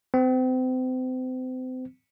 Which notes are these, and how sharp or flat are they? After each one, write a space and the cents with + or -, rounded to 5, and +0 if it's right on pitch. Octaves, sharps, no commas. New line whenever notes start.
C4 -35